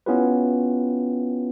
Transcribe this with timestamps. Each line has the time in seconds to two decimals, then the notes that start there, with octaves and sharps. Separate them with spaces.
0.06 B3 C#4 E4 F4 G4 B4